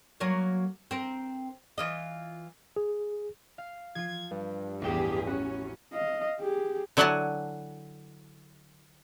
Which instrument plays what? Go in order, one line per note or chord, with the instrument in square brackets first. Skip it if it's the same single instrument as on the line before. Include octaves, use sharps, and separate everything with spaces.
[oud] F#3 A#3 C#5
C4 A#4
E3 F4 D#5
[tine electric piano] G#4
[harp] F5
[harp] F3 F4 [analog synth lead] G#6
[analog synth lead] G2
[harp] A1 G5 E7 [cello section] E2 G4 G#4
[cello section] C#4 [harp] F#4 B5 C#6
[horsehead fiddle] D#5 F5
G4 G#4
[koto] D3 F#3 E4 F#5 G#5 A5